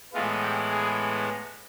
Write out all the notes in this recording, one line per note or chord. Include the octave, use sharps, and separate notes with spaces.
A2 E3 G#3 B3 F4
G4
G#4